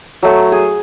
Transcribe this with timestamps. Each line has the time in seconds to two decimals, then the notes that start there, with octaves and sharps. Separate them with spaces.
0.22 F#3 A3
0.52 G#4